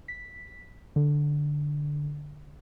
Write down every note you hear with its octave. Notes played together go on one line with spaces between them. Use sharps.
B6
D3